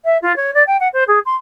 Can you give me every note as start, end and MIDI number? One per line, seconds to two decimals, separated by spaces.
0.04 0.17 76
0.22 0.35 65
0.36 0.53 73
0.54 0.63 74
0.66 0.76 79
0.80 0.88 78
0.93 1.03 72
1.07 1.19 68
1.25 1.35 84